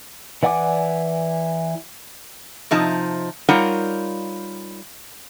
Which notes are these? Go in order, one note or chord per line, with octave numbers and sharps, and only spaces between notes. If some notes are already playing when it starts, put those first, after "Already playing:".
E3 D5 F#5 G#5 D6
C3 F3 D#4 A5
G3 D#4 F4 A#4 C#5 F#5